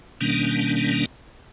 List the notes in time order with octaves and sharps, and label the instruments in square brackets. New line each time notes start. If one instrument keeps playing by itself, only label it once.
[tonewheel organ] B2 D#3 G3 A#3 C#4 D4